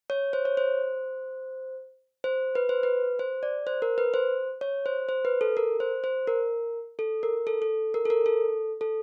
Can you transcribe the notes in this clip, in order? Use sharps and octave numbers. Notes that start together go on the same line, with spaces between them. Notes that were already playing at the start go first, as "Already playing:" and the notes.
C#5
C5
C#5
C5
C5
B4
C5
B4
C5
D5
C5
A#4
B4
C5
C#5
C5
C5
B4
A4
A#4
C5
C5
A#4
A4
A#4
A4
A4
A#4
A4
A#4
A4
A4